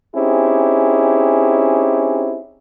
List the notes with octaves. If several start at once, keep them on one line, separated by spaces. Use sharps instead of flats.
C4 C#4 D#4 E4 G4 G#4